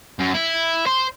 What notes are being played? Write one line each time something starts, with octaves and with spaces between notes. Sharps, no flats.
F#2
E4
C5